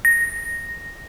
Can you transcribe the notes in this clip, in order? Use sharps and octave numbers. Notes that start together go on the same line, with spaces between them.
A#6